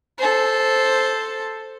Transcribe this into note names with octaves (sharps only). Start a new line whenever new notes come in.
A4 C5